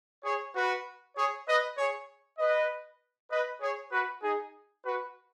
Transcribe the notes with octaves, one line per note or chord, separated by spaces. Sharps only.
G#4 C#5
F#4 B4
G#4 C#5
B4 D#5
G#4 C#5
B4 D#5
B4 D#5
G#4 C#5
F#4 B4
D#4 G#4
F#4 B4